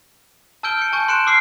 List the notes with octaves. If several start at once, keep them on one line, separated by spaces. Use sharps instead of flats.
A5 E6 F6 G6 D7 G7
G6 C#7
G#5 A5 C#6 G6
C6 F#6 C#7 D7 E7
C#6 D6 E6 F6 C7